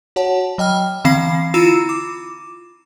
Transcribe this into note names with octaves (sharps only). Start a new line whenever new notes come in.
F#4 C#5 F#5 A5
F#3 D#5 G5 F6
D3 E3 C4 F5 B5 C7
E4 F4 A#5 B5 E6 E7
D6